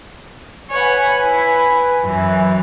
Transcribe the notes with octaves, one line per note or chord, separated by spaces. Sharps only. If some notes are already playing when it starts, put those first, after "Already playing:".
B4 C#5 F#5 G#5
E4
F#2 E3